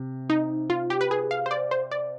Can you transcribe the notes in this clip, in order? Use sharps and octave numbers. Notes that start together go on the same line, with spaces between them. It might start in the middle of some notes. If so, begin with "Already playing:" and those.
Already playing: C3
D#4
F4
G4
B4
G#4
F5
C5
D5
C5
D5